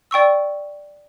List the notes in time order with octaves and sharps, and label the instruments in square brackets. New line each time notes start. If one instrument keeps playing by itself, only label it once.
[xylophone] D5 G5 C#6 E6